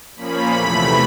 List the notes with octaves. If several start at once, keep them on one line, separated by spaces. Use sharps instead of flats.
A#2 F3 A#3 C#4 B5
E2 C3 E3 A3